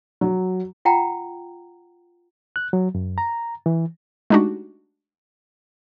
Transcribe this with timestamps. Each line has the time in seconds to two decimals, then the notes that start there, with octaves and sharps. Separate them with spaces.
0.21 F#3
0.85 F4 F#5 G5 A#5
2.56 F#6
2.73 F#3
2.95 F#2
3.18 A#5
3.66 E3
4.30 G#3 A3 D4 D#4 F#4 G4